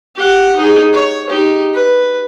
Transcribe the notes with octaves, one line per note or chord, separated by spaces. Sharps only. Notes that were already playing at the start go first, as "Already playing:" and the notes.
G4 F#5
D#4 G#4
C#5
D#4 G4
B4